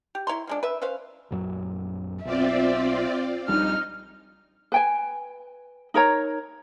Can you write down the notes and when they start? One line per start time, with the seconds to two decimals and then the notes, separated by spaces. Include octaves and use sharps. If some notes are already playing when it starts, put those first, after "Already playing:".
0.15 G4
0.27 E4 C#5 A#5 C6
0.47 F3 G#3 D4
0.63 B4 E5
0.82 C#4 B4 C5 F5
1.31 A#1 F#2 F#3
2.25 B1 C4 F4 D5 E5
3.48 A#1 G3 D4 D#4 F6
4.72 B4 G5 G#5
5.94 D#4 A#4 C#5 A#5